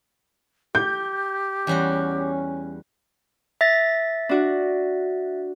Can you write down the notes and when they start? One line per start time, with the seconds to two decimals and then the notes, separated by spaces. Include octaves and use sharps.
0.75 G4 G6
1.67 E2 G3 C#4 F#4
3.61 E5 A6 A#6
4.29 D4 F#4